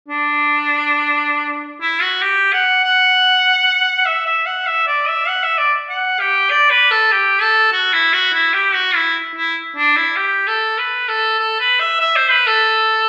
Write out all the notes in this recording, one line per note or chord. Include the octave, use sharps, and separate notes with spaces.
D4
E4
F#4
G4
F#5
F#5
E5
E5
F#5
E5
D5
E5
F#5
E5
D5
F#5
G4
D5
B4
A4
G4
A4
F#4
E4
F#4
E4
G4
F#4
E4
E4
D4
E4
G4
A4
B4
A4
A4
B4
E5
E5
C5
B4
A4